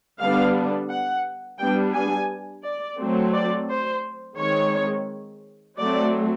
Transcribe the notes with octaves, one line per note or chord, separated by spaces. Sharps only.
D3 G3 B3 D4 F5
F#5
G3 B3 D4 G5
G#5
D5
F#3 A3 C4
D5
C5
D#3 G#3 C4 C#5
F#3 A3 C4 D5